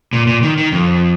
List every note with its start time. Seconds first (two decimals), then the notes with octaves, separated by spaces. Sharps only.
0.13 A#2
0.27 A#2
0.43 D#3
0.58 D#3
0.72 F2